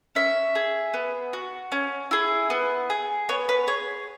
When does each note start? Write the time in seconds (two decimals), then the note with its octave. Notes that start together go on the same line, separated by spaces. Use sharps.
0.15 C#4 E5
0.55 G#4
0.94 B3
1.33 F#4
1.72 C#4
2.11 E4 G#4
2.50 B3
2.90 G#4
3.29 B3 C#5
3.49 B4
3.67 G#4 C#5